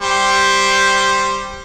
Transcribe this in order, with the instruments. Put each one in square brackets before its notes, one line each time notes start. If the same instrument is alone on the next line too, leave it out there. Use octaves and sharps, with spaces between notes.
[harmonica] G3 C5